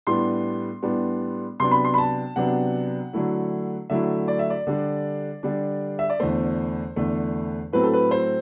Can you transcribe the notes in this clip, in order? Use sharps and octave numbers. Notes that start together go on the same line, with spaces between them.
A2 G3 B3 D4 C6
A2 G3 B3 D4
C3 F#3 B3 D4 C6
B5
C6
B5
A5
C3 F#3 B3 D4 F#5
D3 F#3 A3 E4
D3 F#3 A3 E4 E5
D5
E5
D5
D3 G3 D4
D3 G3 D4
E5
D5
E2 D3 A3 C5
E2 D3 A3
A2 F#3 A3 C4 B4
A4
B4
C5